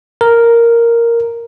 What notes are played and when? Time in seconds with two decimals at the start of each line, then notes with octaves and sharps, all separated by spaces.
0.21 A#4